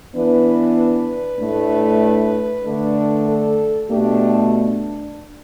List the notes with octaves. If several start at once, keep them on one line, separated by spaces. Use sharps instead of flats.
E3 B3 D4 B4
B4
A2 A3 D4
D3 A3 D4
A4
B2 A3 D4 G4
D4